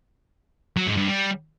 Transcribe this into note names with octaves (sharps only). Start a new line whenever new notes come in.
F#3
G#2
G2
G3